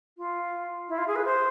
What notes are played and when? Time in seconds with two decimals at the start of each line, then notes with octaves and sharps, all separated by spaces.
0.18 F4
0.89 E4
0.98 F4
1.07 G#4
1.16 B4
1.25 C5